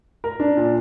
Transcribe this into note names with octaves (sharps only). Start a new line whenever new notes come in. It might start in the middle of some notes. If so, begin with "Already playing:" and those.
A#4
D4
A#2